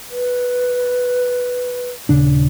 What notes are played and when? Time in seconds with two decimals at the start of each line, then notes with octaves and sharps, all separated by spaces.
0.09 B4
2.09 D#1 C#3 D4